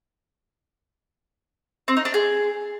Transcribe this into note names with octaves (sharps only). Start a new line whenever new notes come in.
C4
D#4
D4
G#4